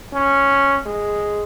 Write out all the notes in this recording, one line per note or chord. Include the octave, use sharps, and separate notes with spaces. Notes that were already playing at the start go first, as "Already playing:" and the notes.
C#4
G#3